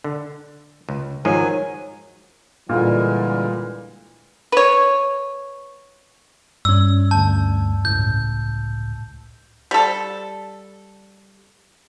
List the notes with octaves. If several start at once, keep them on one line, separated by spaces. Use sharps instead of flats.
D3
C#2
G#2 D#3 F3 F#3 G#5
A#2 D3 E3 G3 G#3
B4 C#5
G2 C#4 E6
D2 A5 G6
G1 C#2 A2 G6
G3 A4